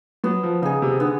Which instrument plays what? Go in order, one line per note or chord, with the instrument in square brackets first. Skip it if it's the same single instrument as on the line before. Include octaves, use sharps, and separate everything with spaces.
[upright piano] F#3 [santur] B3
[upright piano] F3
[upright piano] C#3 [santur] D#4 G#4
[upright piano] C3
[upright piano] D3 [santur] B3